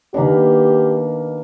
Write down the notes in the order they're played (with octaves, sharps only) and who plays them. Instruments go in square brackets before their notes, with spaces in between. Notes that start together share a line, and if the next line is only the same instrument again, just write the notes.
[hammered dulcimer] B2 A#3 [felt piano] D#3 D4 [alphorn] G4